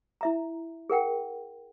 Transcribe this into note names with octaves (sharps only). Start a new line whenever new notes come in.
E4 E5 A#5
G#4 A#4 F#5 G5